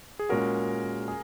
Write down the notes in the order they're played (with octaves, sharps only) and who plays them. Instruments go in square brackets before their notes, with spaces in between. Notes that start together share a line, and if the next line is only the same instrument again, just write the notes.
[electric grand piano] G#4
[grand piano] A#2 G#3 C#4 F#4 [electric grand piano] A#4
[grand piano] G#4